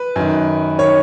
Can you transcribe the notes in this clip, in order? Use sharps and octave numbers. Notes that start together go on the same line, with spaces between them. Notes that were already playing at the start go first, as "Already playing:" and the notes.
Already playing: B4
F#2 D#3
D#3 C#5